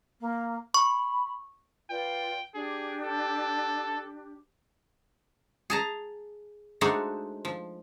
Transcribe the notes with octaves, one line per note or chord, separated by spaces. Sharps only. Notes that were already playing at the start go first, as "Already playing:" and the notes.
A#3
B5 C#6
F4 B4 D5 G5
D4 G4 G#4
A4
G#4 A5 A#5
G#3 A3 D4 D#4 F#4 C5
F3